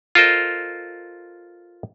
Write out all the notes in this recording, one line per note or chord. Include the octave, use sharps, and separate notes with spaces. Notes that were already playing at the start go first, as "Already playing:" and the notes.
F4 A4 A#4 C5 D#5